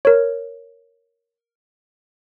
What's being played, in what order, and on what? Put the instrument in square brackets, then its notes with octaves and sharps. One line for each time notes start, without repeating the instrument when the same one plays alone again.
[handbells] A#4 C#5